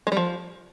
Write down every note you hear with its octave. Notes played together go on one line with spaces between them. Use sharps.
G#3
G3
F3